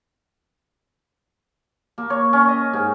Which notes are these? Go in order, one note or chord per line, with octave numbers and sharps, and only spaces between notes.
A#3
C#5
C#4
D#5
G#2